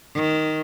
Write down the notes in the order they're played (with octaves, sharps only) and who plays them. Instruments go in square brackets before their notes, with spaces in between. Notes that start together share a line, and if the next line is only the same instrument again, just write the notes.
[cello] D#3